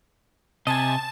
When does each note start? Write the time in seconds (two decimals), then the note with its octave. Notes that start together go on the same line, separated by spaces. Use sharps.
0.67 C3 D#5 G#5 A5